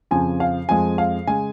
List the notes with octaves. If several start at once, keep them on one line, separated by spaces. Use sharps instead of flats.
F2 C#3 F3 G#5
F5
F2 F3 G#3 G#5
F5
C#3 G#3 G#5